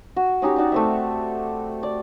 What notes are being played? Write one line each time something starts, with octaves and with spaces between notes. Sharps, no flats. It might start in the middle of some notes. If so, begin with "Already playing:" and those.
F#4
C#4 D#4 F#4 G4
D#4 F#4 G4 D5
A3 C4 E5
D5